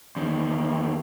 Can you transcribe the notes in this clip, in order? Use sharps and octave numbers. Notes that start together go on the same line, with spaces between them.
E2 D#3